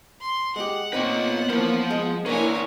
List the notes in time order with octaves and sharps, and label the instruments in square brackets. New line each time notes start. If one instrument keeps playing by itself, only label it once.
[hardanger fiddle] C6
[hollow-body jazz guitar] G#3 G4 [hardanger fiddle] F#5
[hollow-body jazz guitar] A#2 C4 D#4 [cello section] B3 F4 [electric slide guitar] B4 C#5
[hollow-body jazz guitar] E3 A#3 C#4 [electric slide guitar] F3 C5
[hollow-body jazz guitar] G#3
[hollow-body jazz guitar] A#3 D4 [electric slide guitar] C#4 B4 [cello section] E4 A#4 [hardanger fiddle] C#5 G#5